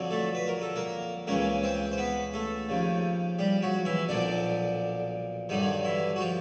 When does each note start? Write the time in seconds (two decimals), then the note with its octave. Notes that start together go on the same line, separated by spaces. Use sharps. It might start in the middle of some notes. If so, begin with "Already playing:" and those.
Already playing: F2 D3 F#3
0.11 A3 A4
0.35 B4
0.48 A#4
0.62 A4
0.76 A#3 A#4
1.27 C#2 C#3 E3 A#3 A#4
1.63 C4 C5
1.91 C5
1.98 B3 B4
2.33 A3 A4
2.69 D#2 C#3 F3
3.39 G3 G4
3.62 F#3 F#4
3.85 E3 E4
4.09 B1 A#2 D3 F3 D4
5.49 G2 D3 D#3 F#3 D#4
5.84 E3 E4
6.16 F#4
6.20 F3 F4